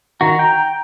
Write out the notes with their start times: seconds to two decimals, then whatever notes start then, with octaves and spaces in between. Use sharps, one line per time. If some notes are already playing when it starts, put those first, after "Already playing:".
0.21 D#3 F#4 A#5
0.39 G5